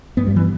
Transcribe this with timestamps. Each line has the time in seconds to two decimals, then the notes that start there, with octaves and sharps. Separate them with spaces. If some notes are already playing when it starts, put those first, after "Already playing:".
0.17 G2 B3
0.27 G3
0.36 E3